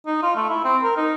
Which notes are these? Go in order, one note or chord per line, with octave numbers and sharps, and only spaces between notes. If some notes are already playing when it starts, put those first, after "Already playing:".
D#4
F4
A3
E4
C4
A#4
D#4